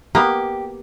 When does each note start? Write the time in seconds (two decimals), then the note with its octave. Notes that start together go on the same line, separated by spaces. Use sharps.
0.15 A#3 B3 G4